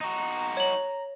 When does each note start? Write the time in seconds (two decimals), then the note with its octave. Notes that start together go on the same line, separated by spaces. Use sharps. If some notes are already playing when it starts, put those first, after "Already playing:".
0.01 D#4 F#4 A#5
0.57 C#5 F#7